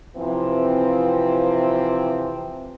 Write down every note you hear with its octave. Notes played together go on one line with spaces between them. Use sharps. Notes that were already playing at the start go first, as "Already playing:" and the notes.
C3 E3 F3 C4